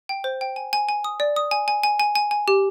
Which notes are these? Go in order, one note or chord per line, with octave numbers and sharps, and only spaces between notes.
G5
C5
G5
G#5
G#5
G#5
D#6
D5
D#6
G#5
G#5
G#5
G#5
G#5
G#5
G4